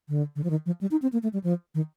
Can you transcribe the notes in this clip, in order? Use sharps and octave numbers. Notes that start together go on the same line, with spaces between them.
D3
D3
F3
D#3
F3
G3
D#4
C4
A#3
A3
G3
F3
D#3